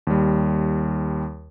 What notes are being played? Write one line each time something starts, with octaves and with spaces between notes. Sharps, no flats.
D#2 G3